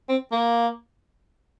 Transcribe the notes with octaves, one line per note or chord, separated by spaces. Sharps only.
C4
A#3